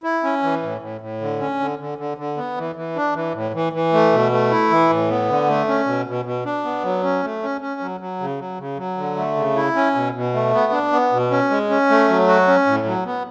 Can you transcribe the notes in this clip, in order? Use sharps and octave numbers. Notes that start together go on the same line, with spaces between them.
E4
C#4
E3
A2
A2
A2
D3
C#4
D3
D3
D3
D3
B3
E3
E3
D4
E3
A2
E3
E3
A3
B2
A3
E4
E3
A2
B3
D3
A3
C#4
B2
B2
B2
D4
B3
F#3
C#4
A3
C#4
C#4
F#3
F#3
C#3
F#3
C#3
F#3
D3
A3
C#3
E4
C#4
B2
B2
A3
B3
D4
B3
B2
C#4
G#3
C#4
A3
F#3
F#4
C#4
A2
F#3
B3